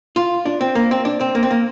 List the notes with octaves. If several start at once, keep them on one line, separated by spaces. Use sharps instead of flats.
F4
D4
C4
A#3
C4
D4
C4
A#3
C4
A#3